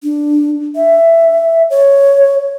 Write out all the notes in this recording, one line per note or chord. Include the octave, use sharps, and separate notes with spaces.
D4
E5
C#5